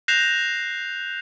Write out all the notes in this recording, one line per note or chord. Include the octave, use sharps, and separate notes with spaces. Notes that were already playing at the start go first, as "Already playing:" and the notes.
F#6 G6 A#6 C7 E7 F7